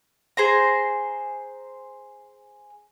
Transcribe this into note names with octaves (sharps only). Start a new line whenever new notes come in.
G#4 C5 A#5